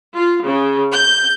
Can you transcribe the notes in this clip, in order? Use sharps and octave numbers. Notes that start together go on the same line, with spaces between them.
F4
C#3
G6